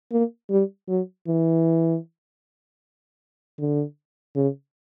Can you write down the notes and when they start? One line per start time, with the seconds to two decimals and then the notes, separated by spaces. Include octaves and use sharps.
0.12 A#3
0.50 G3
0.88 F#3
1.27 E3
3.59 D3
4.36 C#3